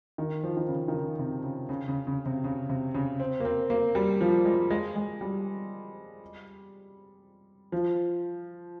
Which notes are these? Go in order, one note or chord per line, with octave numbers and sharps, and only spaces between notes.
D#3
F3
D#3
C#3
D#3
C#3
C3
C#3
C#3
C#3
C#3
C3
C#3
C3
C#3
C4
A#3
C4
A#3
G3
F3
G#3
G#3
G#3
G3
F3